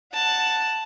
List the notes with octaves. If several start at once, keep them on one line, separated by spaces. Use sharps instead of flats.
F#5 A5